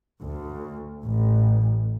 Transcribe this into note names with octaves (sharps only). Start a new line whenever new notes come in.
D2
A1